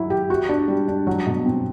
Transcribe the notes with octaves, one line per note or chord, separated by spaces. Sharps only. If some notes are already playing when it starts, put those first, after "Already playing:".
Already playing: F#3 E4
G4
F#4
D4
G3
D4
F#3
B2
C4